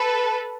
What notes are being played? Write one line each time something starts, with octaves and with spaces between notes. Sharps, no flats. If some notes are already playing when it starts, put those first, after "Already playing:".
Already playing: A4 B4